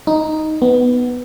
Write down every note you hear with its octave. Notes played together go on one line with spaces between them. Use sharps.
D#4
B3